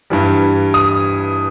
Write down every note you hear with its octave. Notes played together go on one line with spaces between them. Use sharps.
G2 E3 G3
D#6